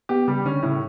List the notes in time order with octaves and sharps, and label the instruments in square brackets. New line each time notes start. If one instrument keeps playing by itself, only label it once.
[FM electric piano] B3 [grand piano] G4
[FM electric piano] C#3 [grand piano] G3
[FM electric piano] D3 [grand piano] C#4
[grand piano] A2 [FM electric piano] C#3